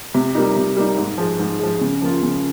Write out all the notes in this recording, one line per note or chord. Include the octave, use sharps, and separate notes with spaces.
C3
G3 A#3 D#4
C3
G3 A#3 D#4
G#2
F3 G#3
G#2
F3 G#3
C#3
F3 A#3 F4
C#3